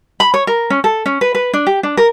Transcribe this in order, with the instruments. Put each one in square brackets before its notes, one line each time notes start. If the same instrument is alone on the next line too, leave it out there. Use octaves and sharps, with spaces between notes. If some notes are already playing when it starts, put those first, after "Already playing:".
[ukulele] B5
C#5
A#4
C#4
A4
C#4
B4
B4
D4
G4
D4
A#4